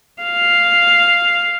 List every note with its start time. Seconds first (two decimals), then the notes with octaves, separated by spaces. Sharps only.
0.23 F5